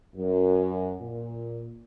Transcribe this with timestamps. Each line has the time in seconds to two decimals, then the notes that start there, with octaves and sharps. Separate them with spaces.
0.16 F#2
1.02 A#2